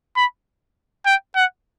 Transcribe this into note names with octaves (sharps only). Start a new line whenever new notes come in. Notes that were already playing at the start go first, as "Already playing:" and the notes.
B5
G5
F#5